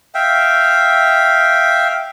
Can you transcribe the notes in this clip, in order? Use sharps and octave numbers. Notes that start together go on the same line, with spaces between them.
E5 F5 G5